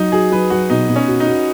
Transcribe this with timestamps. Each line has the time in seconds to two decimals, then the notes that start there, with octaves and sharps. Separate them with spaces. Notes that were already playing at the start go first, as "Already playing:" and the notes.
Already playing: F#3 D#4
0.12 F#4 G#4
0.32 F#3 B4
0.50 F#3 F#4
0.70 B2 D#4
0.89 B2
0.96 C#4
1.08 F#4
1.20 D#4
1.27 F#4